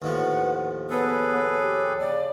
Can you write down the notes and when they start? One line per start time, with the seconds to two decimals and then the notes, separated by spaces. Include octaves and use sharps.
0.02 D#2 A2 F3 B4 F#5
0.90 B3 G#4 A4 B4 C#5
1.58 G4
1.99 C#3 D5